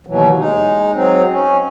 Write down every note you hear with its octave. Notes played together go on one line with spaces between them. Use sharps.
D#2 B2 E3 F#3
G#3 D#4
F#3 C4 D#4
C#4